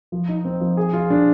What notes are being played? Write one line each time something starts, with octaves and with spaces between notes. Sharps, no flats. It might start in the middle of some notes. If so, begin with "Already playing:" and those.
F3
D#4
C4
F3
G#4
F4
D4